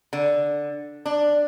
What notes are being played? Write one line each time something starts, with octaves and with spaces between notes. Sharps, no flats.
D3
D4